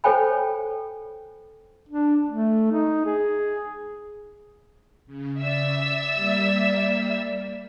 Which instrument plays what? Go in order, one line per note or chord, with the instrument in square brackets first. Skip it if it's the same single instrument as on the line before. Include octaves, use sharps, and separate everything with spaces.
[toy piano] A4 C5 C#5 G5 G#5 B5
[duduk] D4
A3
D#4
G#4
[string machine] C#3
[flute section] D5 [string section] E5 E6
[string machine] G3 A#3